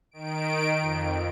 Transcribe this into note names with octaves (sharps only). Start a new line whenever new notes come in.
D#3 D7
F2